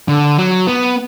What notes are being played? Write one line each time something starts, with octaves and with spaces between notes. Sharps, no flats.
D3
F#3
B3